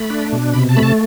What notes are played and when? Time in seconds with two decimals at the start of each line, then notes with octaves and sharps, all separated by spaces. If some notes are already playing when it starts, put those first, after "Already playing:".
Already playing: A3 B5
0.10 D4
0.33 B2
0.53 C3 B5
0.69 A5
0.76 A3 B5
0.83 A5